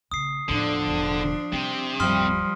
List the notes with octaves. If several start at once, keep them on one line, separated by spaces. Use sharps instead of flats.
A#1 C#3 D#6 C7
E1 A2 D3 F3 D4
E1 A1
C3 G3
D1 G2 F3 G3 C6 D#6 F6